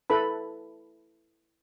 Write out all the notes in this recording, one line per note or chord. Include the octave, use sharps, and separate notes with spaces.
E4 A4 B4 B5